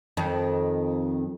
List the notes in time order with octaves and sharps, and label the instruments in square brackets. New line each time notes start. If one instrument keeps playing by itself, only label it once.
[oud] F2 D#3